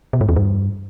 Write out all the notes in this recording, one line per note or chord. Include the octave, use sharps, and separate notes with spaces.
B2
G#2
E2
G2